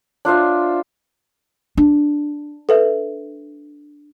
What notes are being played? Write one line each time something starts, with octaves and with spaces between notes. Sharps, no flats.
D4 F4 C5 E5
D4
A4 B4 E5